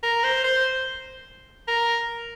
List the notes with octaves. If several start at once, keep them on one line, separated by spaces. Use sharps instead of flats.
A#4
C5
C5
A#4